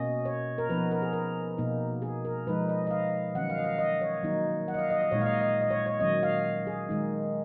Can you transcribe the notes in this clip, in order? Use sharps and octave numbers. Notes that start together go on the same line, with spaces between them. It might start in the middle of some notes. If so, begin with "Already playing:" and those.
Already playing: B2 A#3 C#4 D#5
C#5
A#4
F3 B3 D#4 B4
A#4
G#4
A#4
B2 A#3 D#4
G#4
A#4
F3 G#3 D#4 B4
D#5
D#5
F5
D#3 F#3 C#4 F#5
F5
D#5
F5
D#5
C#5
D#3 F#3 A#3 D#4
F#5
D#5
F5
D#5
D#5
A#2 G#3 D#4 C#5
F5
D#5
D#5
D#5
C#5
C#5
D#3 F#3 C#4 D#5
F5
G#4
D#3 G#3 D#4